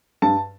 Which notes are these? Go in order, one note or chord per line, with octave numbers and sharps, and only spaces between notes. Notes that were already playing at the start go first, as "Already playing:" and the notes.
G2 A5